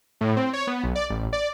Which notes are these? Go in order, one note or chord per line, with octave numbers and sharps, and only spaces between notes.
A2
C4
C#5
B3
B1
D5
A1
D5